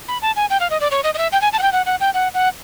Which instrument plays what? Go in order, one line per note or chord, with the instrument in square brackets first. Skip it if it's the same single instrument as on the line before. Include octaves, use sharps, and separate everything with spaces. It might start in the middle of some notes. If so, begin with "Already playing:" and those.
[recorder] B5
A5
G#5
G5
F5
D#5
D5
C#5
D#5
D#5
E5
G5
G#5
A5
F#5
G5
F#5
F#5
G5
F#5
F#5